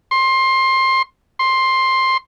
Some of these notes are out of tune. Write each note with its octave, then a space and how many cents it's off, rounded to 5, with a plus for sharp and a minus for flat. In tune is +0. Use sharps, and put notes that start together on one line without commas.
C6 +20
C6 +10